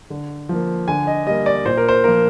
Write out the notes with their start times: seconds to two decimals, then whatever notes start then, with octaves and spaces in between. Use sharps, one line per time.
0.10 D3
0.49 F3 A#3
0.88 D3 G#5
1.07 D#5
1.27 G3 A#3 D#5
1.46 D5
1.66 A#2 C5
1.77 A#4
1.89 C5
2.04 F3 A#3 A#4